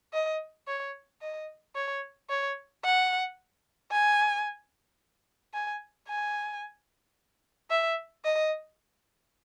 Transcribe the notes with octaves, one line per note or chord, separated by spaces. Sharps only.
D#5
C#5
D#5
C#5
C#5
F#5
G#5
G#5
G#5
E5
D#5